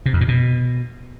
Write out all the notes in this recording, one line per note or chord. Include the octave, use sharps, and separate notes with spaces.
C3
F2
A#2
B2